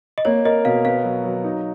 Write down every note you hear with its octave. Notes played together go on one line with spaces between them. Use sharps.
D#5
A#3 C#5
A#4 D#5
B2 F5
B3 F5
F#3
F#3
D#4